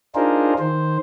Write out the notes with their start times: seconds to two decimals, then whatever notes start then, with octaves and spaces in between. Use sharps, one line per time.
0.15 D4 D#4 F4 G#4 A#4 C5
0.59 D#3 C5